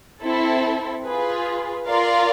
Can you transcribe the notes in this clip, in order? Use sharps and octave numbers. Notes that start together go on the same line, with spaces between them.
C4 E4 A4
F4 G#4 B4
F4 A#4 D5 F5